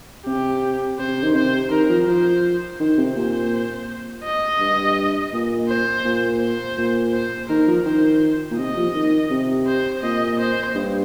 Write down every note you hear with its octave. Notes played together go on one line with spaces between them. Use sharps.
C3 G4
C3 C5
D#3
C3 C5
D#3 A#4
F3
F3 C5
D#3 C5
C3
A#2 C5
D#5
G2
A#2
C5
A#2
C5
A#2
C5
D#3 A#4
F3
D#3 C5
A#2
C3 D#5
F3
D#3
C3
C5
A#2 D#5
C5
G2